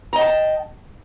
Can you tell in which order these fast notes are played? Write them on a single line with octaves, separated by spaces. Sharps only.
A#5 D#5 G5 A5